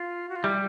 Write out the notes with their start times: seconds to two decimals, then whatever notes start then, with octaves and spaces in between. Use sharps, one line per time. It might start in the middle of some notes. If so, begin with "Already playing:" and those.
Already playing: F4
0.29 F#4
0.36 F4
0.44 G3 E4